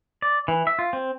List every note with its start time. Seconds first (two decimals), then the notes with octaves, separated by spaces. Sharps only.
0.22 D5
0.48 E3
0.67 E5
0.79 F4
0.93 C4